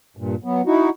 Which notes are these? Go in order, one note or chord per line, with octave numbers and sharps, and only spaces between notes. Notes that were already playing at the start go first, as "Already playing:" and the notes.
G2 A#2
F#3 B3
D#4 E4 F#4